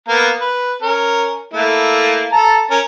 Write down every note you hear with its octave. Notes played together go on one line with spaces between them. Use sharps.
A#3 B3 A#4
B4
C#4 A#4
A3 A#3 E4
A4 A5 A#5
C#4 A#4